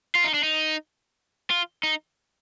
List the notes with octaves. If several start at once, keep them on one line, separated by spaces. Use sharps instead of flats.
F4
D#4
D4
D#4
F4
D#4